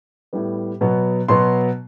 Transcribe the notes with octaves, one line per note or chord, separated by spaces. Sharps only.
A2 G3 B3
B2 F#3 B3
B2 F#3 B3 C6